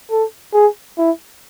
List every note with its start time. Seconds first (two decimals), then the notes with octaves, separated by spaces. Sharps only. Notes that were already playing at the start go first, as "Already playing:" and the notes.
0.11 A4
0.54 G#4
0.98 E4